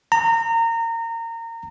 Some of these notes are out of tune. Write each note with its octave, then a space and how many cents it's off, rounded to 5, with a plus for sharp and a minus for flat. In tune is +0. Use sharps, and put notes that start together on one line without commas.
A#5 -25